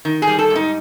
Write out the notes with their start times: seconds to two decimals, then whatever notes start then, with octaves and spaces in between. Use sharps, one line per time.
0.05 D#3
0.22 G#4
0.28 G3
0.39 A4
0.50 G#2
0.55 D#4